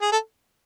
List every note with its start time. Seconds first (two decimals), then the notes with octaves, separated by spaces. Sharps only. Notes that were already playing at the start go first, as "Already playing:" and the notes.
0.02 G#4
0.12 A4